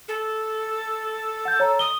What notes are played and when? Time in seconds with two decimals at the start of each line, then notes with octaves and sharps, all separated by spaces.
0.08 A4
1.45 F#5 G6
1.60 C#5 A#5
1.79 D#6 G7